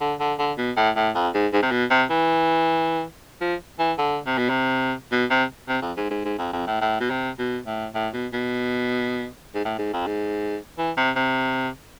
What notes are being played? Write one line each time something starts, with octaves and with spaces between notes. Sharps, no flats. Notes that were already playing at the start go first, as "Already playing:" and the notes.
D3
D3
D3
B2
A2
A2
F2
G#2
G#2
C3
B2
C3
E3
F3
E3
D3
C3
B2
C3
B2
C3
C3
F2
G#2
G#2
G#2
F2
F2
A2
A2
B2
C3
B2
A2
A2
B2
B2
G#2
A2
G#2
F2
G#2
E3
C3
C3